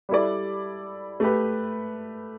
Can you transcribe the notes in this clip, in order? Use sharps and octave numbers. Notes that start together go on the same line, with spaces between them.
G3 E4 A4 D5
A3 G4 B4